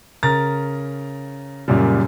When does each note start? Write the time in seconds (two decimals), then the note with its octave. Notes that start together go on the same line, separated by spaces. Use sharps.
0.23 C#3 A#4 A#5 A6
1.68 F#2 A#2 C#3 G3